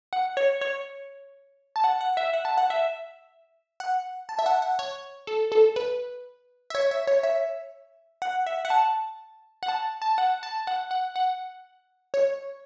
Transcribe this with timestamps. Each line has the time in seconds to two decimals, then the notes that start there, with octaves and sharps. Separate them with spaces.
0.13 F#5
0.37 C#5
0.61 C#5
1.76 A5
1.84 F#5
2.01 F#5
2.17 E5
2.33 F#5
2.45 A5
2.57 F#5
2.70 E5
3.80 F#5
4.29 A5
4.39 E5
4.46 F#5
4.62 F#5
4.79 C#5
5.27 A4
5.52 A4
5.76 B4
6.70 E5
6.75 C#5
6.91 E5
7.07 C#5
7.23 E5
8.22 F#5
8.47 E5
8.65 F#5
8.70 A5
9.63 F#5
9.68 A5
10.02 A5
10.18 F#5
10.43 A5
10.67 F#5
10.91 F#5
11.16 F#5
12.14 C#5